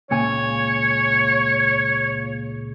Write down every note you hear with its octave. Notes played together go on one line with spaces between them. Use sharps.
C#2 A#2 C#5 G#5